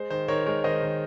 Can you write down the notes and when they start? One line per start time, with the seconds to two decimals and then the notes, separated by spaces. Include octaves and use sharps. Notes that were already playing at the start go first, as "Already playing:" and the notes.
Already playing: G#3 C5
0.10 D#3 C5
0.28 D#3 A#4 C#5
0.46 G#3 A#4 C#5
0.64 D#3 C5 D#5
0.83 D#3